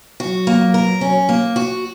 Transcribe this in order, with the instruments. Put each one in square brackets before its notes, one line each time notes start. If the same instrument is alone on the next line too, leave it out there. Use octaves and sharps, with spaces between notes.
[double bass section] F#3 [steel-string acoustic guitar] F#4
[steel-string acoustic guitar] A#3
A#4
C#4
A#3
F#4